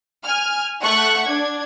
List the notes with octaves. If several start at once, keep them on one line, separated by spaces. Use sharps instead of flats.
G#5 F6
A3 E5 F#5 C#6 F#6
D4 G#6